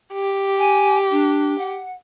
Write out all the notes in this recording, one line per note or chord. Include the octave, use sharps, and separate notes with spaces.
G4
G#5
D4
F#5